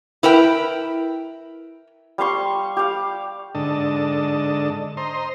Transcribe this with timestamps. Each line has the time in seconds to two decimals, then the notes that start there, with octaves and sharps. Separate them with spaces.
0.23 E4 A#4 B4 G5
2.18 G3 F5 C6 C#6
2.77 G4 F5
3.55 G#2 D3 D4 A4 D#5 A5
4.97 C5 D#5 A#5 C6